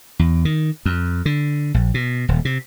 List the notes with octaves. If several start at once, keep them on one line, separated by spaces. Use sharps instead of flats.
E2
D#3
F2
D3
A#1
B2
D#1
C3